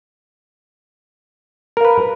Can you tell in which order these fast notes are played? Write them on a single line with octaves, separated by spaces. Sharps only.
A#4 F5 B4